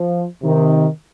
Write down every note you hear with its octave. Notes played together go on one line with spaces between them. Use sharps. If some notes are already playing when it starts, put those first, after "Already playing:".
Already playing: F3
C3 D#3